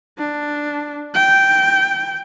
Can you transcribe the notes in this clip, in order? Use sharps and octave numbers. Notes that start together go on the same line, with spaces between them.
D4
G5